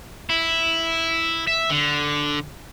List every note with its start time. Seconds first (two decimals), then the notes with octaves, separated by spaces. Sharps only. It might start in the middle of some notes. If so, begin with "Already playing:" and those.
0.30 E4
1.47 E5
1.70 D3